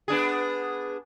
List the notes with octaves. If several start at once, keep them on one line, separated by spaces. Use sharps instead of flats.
B3 D4 G#4